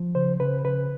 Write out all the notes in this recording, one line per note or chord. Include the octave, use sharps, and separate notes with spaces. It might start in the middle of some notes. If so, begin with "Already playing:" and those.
Already playing: F3
C#3 C5
C#3 B4
C#3 B4